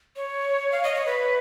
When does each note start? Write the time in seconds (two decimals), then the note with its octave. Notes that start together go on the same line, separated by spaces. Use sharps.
0.16 C#5
0.72 F5
0.83 D#5
0.94 C#5
1.06 B4